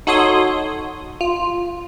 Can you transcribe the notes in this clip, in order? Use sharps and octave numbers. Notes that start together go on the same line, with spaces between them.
D#4 F#4 A4 C#5 C6 D#6
F4